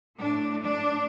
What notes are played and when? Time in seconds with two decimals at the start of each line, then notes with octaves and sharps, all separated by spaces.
0.19 A2 A3 D4
0.59 D4